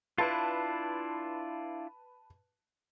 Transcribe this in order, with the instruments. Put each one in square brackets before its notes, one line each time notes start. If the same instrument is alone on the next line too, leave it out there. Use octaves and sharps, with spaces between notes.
[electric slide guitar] D4 E4 F4 [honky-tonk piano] B4 A5